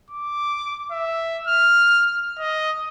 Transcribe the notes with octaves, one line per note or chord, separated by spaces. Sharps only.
D6
E5
F6
D#5